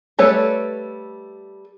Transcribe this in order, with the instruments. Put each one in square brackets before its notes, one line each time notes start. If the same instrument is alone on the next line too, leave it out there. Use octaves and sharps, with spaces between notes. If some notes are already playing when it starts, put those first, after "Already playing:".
[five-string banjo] G3 A3 A4 B4 C#5